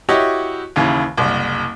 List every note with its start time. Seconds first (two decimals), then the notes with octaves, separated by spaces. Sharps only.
0.09 E4 F#4 G4 C#5 D#5
0.76 D#2 C#3 E3
1.17 F#1 C2